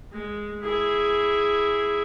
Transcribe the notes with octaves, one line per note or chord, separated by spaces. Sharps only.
G#3
E4 G#4